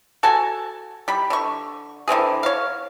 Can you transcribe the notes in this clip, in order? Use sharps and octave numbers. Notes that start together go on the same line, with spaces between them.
F#4 A4 G#5 A5
G3 B5
D3 C#6
D3 E3 C4 G#4
C#5 F5